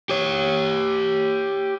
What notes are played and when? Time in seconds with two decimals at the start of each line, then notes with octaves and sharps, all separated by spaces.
0.09 G4 C#5